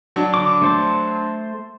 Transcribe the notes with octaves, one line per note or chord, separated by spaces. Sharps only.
F#3 D4
D3 D6
A3 C5 A5